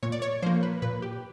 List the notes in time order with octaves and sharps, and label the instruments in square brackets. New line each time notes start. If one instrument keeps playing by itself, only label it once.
[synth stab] A#2 C#5
D5
C#5
F3 A#3 C5
B4
A#2 B4
G4